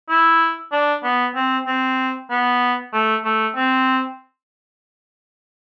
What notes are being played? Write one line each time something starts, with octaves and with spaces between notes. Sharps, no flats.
E4
D4
B3
C4
C4
B3
A3
A3
C4